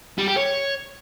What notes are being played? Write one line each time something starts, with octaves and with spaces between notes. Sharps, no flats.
G3
G4
C#5